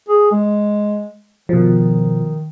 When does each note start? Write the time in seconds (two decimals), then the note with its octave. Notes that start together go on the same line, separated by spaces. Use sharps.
0.08 G#4
0.31 G#3
1.49 B2 D#3 F3